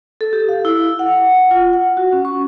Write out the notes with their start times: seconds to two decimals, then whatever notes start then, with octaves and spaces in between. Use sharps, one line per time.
0.21 A4
0.33 G4
0.49 F5
0.65 E4
0.99 F#5
1.51 F4
1.73 F#5
1.97 F#4
2.13 C#4
2.25 C#6